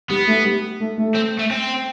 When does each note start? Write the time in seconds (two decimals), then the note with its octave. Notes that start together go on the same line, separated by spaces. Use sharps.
0.10 G3 B3
0.27 A3
0.45 G3
0.80 A3
0.98 A3
1.15 C4
1.39 A3
1.51 C4